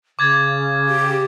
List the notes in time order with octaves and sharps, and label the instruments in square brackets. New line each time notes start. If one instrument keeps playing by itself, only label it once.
[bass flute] C#3 [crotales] D6 G#6 A6
[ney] G4